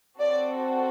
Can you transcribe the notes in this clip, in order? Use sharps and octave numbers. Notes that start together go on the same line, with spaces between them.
C4 F#4 A4 D5